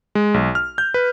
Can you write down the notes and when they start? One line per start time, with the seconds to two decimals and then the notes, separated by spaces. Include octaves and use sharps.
0.15 G#3
0.34 B1
0.55 F6
0.78 G6
0.94 B4